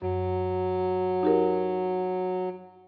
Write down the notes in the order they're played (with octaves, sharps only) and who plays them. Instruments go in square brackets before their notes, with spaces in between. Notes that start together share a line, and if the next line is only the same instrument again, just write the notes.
[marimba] F#2 [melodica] F#3
[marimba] D#4 G4 A#4